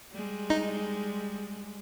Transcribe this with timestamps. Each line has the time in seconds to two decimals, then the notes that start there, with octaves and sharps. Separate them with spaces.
0.12 G3 G#3
0.50 D#4